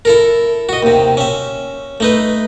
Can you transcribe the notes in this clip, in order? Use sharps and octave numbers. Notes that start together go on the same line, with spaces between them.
E4 A4 A#4
F#4 D#5
D#2 C3
C#4 E5
A3 D#4 B4